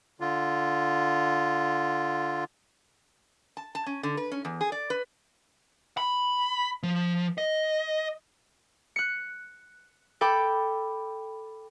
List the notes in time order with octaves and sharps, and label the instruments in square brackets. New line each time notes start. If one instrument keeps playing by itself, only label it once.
[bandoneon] D3 F4
[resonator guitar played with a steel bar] A5
A5
C#4
D3
B4
C#4
E2
G#4
D5
B4
[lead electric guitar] B5
F3
D#5
[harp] F#6 C#7
A4 G5 B5 D6